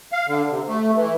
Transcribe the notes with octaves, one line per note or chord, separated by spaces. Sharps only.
F5
D3
C3
A3
E3